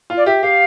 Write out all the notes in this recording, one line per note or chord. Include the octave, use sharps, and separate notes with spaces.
F4
D5
G4 E5
G4 F5